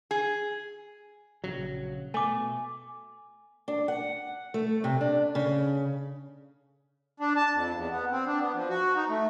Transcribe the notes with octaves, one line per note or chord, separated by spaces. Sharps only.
G#4
A#1 C#3 F#3
B2 A3 G#5 D6
D4
F#5
A3
C3
D4
C#3
D4
A5
F2
E2
B3
C4
D4
B3
F3
F#4
D#4
A3